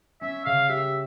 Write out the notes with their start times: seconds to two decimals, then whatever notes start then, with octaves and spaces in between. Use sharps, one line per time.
0.21 C#4 E5
0.45 C#3 F5
0.69 G4 E5